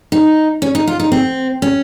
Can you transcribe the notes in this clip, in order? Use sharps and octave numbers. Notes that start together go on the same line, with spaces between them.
D#4
C#4
D#4
F4
D#4
C4
C#4